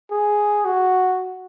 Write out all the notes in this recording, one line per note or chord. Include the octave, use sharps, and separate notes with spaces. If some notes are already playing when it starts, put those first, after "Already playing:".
G#4
F#4